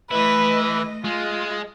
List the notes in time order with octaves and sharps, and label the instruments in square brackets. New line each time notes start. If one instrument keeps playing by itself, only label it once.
[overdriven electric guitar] E3 E4 [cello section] A3 D#5 [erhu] B4
[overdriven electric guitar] G#3 [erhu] F4